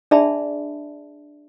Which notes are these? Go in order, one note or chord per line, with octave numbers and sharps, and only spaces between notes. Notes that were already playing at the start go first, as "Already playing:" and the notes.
D4 G#4 D5 E5 A5 B5